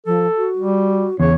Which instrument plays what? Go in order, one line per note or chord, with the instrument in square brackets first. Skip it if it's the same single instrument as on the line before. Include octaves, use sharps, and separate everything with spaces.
[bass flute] F3 [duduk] A4
[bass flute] F#4
[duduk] G3
[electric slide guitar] E2 [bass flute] C#3 [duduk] C#5